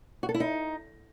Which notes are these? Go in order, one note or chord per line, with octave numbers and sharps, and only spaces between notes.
F#4
A4
E4
D#4